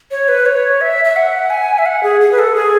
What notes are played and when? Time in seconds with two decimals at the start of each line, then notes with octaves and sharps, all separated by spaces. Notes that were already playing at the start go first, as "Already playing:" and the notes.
0.11 C#5
0.28 B4
0.46 C#5
0.81 E5
1.05 E5
1.16 F#5
1.50 G#5
1.78 E5
1.86 F#5
2.03 G#4
2.20 G#4
2.32 B4
2.39 A4
2.55 G#4